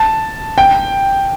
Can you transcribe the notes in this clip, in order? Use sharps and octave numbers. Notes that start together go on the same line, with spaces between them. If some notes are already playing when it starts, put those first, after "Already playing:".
Already playing: A5
G5